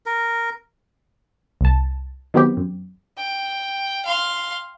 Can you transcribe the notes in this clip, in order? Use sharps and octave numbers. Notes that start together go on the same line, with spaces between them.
A#4
C2 A5
D#3 F#3 B3 C4 G4
F#2
G5
F5 C6